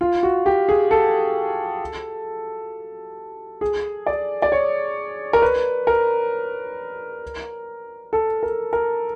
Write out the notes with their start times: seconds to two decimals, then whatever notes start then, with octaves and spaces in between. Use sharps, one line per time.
0.01 F4
0.23 F#4
0.46 G4
0.69 G#4
0.91 A4
3.61 G#4
4.06 D5
4.42 D5
4.52 C#5
5.33 A#4
5.42 B4
5.87 A#4
8.13 A4
8.43 A#4
8.73 A#4